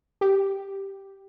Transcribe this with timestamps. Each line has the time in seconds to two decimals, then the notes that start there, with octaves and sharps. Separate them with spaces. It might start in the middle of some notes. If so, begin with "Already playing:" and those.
0.21 G4